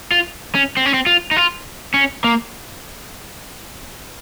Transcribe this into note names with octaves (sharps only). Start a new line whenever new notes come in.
F4
C#4
C4
C#4
C4
F4
D#4
F4
C#4
A#3